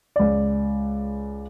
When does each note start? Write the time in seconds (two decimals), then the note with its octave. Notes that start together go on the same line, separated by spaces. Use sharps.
0.16 C#2 D5